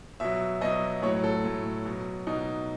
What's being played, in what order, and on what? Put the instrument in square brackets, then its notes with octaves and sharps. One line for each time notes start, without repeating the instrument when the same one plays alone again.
[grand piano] B2 F#3 E5
B2 F#3 D#5
A2 C#5
F#3
A4
A2 F#3
B2 F#3
B2 F#3 D#4